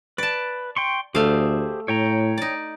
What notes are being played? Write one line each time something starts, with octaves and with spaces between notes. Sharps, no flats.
B4 D5 A5
G5 C6 C#6
D2 A3 G4 G#4 C5 F5
A2 C#5 G5 A#5
D#4 D5